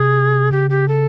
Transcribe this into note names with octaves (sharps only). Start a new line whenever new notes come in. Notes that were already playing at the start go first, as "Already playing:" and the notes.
Already playing: C3 G#4
C#3 G4
G4
A4